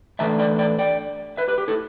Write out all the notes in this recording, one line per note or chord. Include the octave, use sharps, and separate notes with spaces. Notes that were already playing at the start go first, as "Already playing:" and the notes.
A2 E3 A3 D4 E5 A5
D5 G5
D5 G5
D5 G5
B4 E5
G4 B4
G4
E4 A4